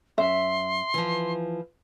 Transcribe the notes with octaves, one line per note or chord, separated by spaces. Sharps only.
F#2 E5 C6
E3 F3